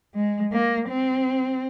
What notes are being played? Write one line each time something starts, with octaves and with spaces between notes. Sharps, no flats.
G#3
A#3
C4